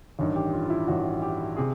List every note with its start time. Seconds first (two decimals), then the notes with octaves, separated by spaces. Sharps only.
0.19 A1 G2 D#3
0.36 G4
0.53 F4
0.64 F4
0.70 E4
0.88 A1 G2 D#3 F#4
1.22 G4
1.57 C3 G#4